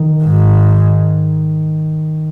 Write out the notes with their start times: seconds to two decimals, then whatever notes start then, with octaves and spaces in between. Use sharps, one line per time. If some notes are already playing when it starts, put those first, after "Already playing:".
Already playing: D#3
0.23 G#2